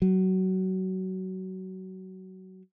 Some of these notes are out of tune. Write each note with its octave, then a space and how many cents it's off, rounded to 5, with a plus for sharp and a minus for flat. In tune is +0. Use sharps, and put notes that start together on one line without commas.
F#3 +20